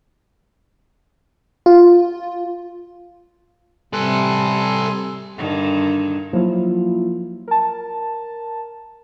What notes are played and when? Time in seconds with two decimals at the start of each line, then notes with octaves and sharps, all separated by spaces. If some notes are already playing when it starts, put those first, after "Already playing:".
1.66 F4
3.93 C3 G3 A4 B4 G#5 C6
5.37 G2 D3 D#3
6.33 F3 F#3 A#3 E4 F4
7.48 A#4 A5